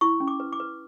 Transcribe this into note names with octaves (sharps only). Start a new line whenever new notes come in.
E4 C#6
C#4
D6
B4
D6
B4